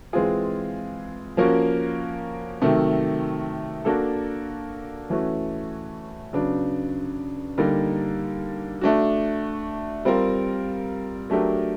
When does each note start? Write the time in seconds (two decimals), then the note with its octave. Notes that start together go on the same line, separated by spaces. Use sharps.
0.13 E3 G#3 C4 F4 G#4
1.37 F3 A#3 C#4 F#4 A#4
2.62 C3 D#3 F#3 A3
3.85 A#3 D4 F#4 A4
5.10 E3 A3 C#4 F#4
6.33 C#3 F#3 B3 D4
7.58 D3 G3 A#3 D#4
8.81 A3 D4 F#4
10.05 G3 C4 F4 A#4
11.30 F#3 A3 D4 G4 A#4